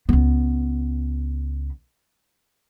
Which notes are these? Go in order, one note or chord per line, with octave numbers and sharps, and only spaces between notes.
C#2 B3